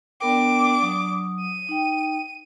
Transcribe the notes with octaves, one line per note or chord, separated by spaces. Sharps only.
B3 D4 A#4 G5 D6
F#3 D#6
D#7
D#4 G5